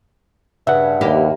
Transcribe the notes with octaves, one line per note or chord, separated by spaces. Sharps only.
G2 C#3 E5 F#5
D#2 A#3 E4 G4